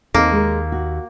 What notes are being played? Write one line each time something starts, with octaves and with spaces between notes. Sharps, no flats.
D#2 A#3 C4 D#4 A4
G#3 A#4
F#4